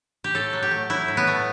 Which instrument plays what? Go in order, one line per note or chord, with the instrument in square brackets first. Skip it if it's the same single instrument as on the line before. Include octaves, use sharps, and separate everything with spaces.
[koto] G4
A2 A4
F#3
G4
A3
F#3 E4
A2
B3
A3